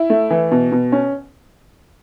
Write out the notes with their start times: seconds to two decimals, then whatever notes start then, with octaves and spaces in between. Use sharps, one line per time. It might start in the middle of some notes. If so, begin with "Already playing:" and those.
Already playing: E4
0.10 A3
0.30 E3
0.51 B2
0.72 B2
0.92 C#4